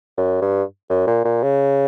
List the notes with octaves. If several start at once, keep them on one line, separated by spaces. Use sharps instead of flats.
F#2
G2
F#2
A#2
A#2
C#3